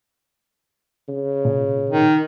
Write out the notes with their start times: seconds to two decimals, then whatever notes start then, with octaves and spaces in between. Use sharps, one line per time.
1.08 C#3
1.45 A#2
1.90 D#3